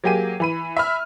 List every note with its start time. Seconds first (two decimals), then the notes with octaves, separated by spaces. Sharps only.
0.04 F#3 A#3 G4 G#4 D#7
0.40 E3 B5 D#7
0.77 E5 B5 F6